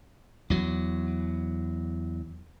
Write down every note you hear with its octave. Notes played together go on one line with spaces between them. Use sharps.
E2 F#3